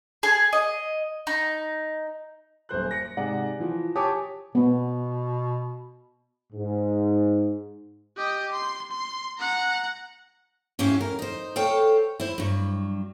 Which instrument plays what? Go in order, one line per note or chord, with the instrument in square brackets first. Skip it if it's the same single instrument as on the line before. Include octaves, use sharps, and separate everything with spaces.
[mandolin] G#4
D#5
D#4
[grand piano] D#1 F#2 C5 F#6
A#6 C#7
G#2 C3 G#4 D5 F#5
E3 F3
G4 C#5 G#5 A5 D6 D#6
[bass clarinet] B2 [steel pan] B3
[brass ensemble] G#2
[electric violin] G4 D#5
C6
C6
F#5 A#5
[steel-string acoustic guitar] G#2 C#4 E4 G4 F5
A#4
D#4 C5
A4 C5 C#5 F5 G5
E4 C5
G2 F#3